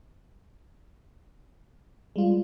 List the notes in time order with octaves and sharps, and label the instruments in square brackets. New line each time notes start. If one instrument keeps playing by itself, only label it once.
[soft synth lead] G3 [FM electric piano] G#3 F4